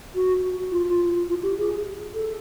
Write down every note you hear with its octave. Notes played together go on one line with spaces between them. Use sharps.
F#4
F4
F4
G4
G#4
A4